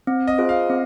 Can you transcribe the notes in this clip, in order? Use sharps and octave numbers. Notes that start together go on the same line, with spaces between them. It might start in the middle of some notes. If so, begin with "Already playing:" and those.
C4
D#5
F4 G#4 C5
F5
C4